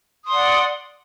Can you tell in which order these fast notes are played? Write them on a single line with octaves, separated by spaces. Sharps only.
D#6 C6 D5 F#5